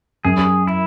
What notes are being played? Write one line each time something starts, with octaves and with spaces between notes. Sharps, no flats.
F#2 G#4
E4